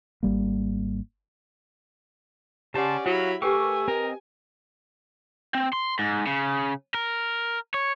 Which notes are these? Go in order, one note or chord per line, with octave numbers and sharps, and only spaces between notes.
G#1 G3 A#3
C#3 C#4 G4 C#5 D5 F#5 A5 C6
F#3 E4 F#4 F5 B5
A3 G4 A#4 B4 G5 G#5 C#6 D6
C4 A#4 D#5
C4
C6
G#2
C#3
A#4
C#5